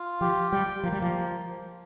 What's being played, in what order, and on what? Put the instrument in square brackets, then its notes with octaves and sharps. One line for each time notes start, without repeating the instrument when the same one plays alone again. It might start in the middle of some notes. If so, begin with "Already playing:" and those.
Already playing: [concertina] F4
[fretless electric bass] F3 [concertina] G4
[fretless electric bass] G3 [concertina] G5
[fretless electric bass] F3 [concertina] A#3
[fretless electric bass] G3
F3